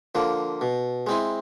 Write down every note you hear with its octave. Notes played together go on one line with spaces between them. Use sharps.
D3 F3 A#3
B2
G#3 C4 E4